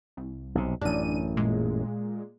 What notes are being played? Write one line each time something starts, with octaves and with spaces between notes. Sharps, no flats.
C2
B1 C3
A1 F#2 D4 D#7
A#2 G#3